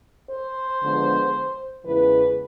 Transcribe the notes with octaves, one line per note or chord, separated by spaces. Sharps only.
C5
D3 F3 G#3 B3
E2 C#3 E3 G#3 B4